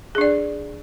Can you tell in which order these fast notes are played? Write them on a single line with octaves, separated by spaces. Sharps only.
G#4 D4 D5